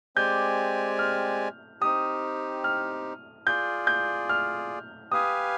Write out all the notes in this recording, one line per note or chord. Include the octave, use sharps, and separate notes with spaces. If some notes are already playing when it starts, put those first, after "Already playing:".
G#3 C4 G4 D5 G#5 G6
F6
C4 D#4 G4 D#6
F6
F4 G#4 D5 G6
G6
F6
G4 B4 F5 G#5 D#6